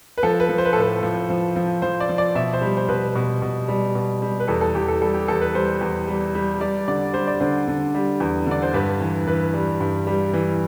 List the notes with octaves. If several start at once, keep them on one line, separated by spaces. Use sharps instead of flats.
B4
F3 A4
B4
F3
C5
B4
A4
A2
B4
F3
F3
F3
F3 C5
D5
F3
D5
B2 E5
C5
G3
C5
B2 B4
B2
B2
G3
B2
G3
B4
E2 A4
A4
E2 G4
A4
G3 A4
G4
E2 A4
B4
G3 C5
E2
G3
G3
G3 D5
D3 D5
G3 C5
D5
D3 C5
D3
G3
E2
D3 D5
C5
G2 B4
E3
E3 B4
G3
G2
G3
E3